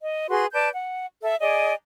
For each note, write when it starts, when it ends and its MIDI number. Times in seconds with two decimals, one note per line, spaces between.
0.01 0.27 75
0.29 0.46 66
0.29 0.46 68
0.29 0.46 71
0.29 0.46 84
0.53 0.69 71
0.53 0.69 74
0.53 0.69 81
0.53 0.69 91
0.73 1.05 78
1.22 1.35 69
1.22 1.35 76
1.40 1.74 68
1.40 1.74 74
1.40 1.74 75
1.40 1.74 80